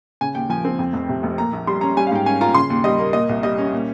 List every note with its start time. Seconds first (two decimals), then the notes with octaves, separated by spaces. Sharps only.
0.21 C#3 G#5
0.35 D#2 G5
0.49 F3 G#5
0.65 C4
0.79 F2
0.93 F1
1.09 C3
1.23 F1
1.38 A#2 A#5
1.53 A#1
1.67 G3 C6
1.81 C#4 A#5
1.97 G3 G#5
2.07 F5
2.11 G#2 G5
2.26 C#4 G#5
2.41 F4 A#5
2.54 C#3 C6
2.70 D#2
2.84 G3 D#5
2.99 A#3
3.13 A#2 D#5
3.29 C2
3.43 G3 D#5
3.58 C#4
3.72 A#2